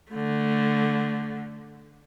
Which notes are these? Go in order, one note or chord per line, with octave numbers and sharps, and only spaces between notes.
D3 A3